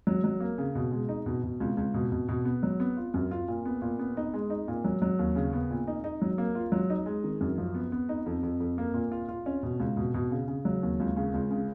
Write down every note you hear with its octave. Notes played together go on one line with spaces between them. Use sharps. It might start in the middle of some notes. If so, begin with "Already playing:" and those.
F#3
F#3
A#3
C#3
B2
G#3
D#4
B2
B2
C#2
C#2
B2
B2
B2
B3
F#3
B3
F4
F#2
F4
A#2
B3
A#2
B3
D#4
G#3
D#4
A#2
F#3
F#3
D#2
C#3
B3
A#2
D#4
D#4
F#3
A#3
F4
F#3
D#4
G#3
D#3
F#2
F3
B3
B3
D#4
F2
F2
F2
A#3
A#2
F4
F4
C#4
B2
C#2
B2
B2
C#3
C#3
F#3
D#2
C#2
C#3
C#2
C#3